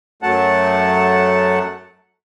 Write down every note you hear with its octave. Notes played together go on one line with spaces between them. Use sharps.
F#2 F#3 A3 F#5 A5